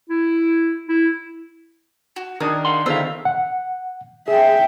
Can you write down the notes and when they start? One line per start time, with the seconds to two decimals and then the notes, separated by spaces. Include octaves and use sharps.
0.10 E4
0.89 E4
2.16 F#4
2.40 D#3 D4 G#4 A#4 D#6
2.65 F5 F#5 C6
2.86 D3 D#3 B3 F4 G#4 C5 E5 F5
3.25 F#5
4.28 G#4 E5 G5